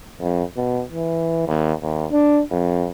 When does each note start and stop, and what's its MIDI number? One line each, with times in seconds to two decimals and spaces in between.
0.22 0.43 41
0.57 0.82 47
0.92 1.47 52
1.48 1.73 39
1.83 2.06 39
2.12 2.42 62
2.51 2.88 41